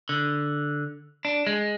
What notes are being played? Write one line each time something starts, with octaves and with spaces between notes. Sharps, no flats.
D3
D4
G#3